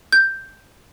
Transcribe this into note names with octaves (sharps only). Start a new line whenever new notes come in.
G6